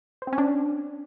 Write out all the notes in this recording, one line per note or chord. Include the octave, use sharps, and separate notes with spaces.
C5
C4
C#4
D4